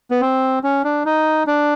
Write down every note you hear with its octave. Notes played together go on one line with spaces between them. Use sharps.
B3
C4
C#4
D4
D#4
D4